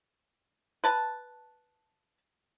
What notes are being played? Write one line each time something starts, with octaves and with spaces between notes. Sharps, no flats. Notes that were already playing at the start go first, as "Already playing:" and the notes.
B4 A5